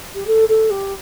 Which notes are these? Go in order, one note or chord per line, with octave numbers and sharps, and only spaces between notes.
G4
A4
A4
G4